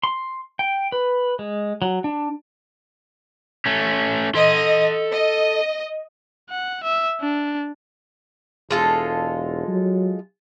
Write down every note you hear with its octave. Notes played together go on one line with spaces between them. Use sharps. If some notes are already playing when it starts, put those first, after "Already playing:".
C6
G5
B4
G#3
F#3
D4
A3 C#4
A4 D#5 C6
D#5
F#5
E5
D4
E1 G#3 F4 A4
F#3